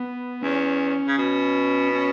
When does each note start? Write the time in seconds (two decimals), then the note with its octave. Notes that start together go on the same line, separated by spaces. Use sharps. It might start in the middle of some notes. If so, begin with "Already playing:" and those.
Already playing: B3
0.43 E2 C#4
1.08 C#3
1.18 B2
1.93 C#4